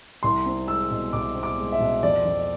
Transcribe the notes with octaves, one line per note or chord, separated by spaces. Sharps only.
C2 C6
C4
G#3 E6
B2
C2 D6
C4
D6
G#3
E5
B2
F2 D5
F2